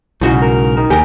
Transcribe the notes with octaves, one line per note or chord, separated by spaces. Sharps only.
B1 G#2 C#3 E4 F#4
A#4
D#3 A#5
D#2 G4 A#4 G#5